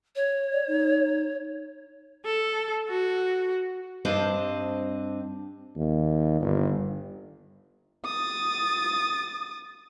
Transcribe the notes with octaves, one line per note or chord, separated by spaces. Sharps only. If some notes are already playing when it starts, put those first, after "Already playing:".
C#5
D5
D#4
A4
F#4
G2 C4 D4 C5 D#5 A5
D#2
G1
D#6 A6